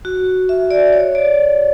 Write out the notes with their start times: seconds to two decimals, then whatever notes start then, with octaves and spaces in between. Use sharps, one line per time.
0.05 F#4
0.49 E5
0.71 D5
0.93 C#5
1.15 D5